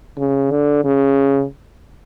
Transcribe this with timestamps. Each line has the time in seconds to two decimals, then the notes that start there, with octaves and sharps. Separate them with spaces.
0.18 C#3
0.51 D3
0.84 C#3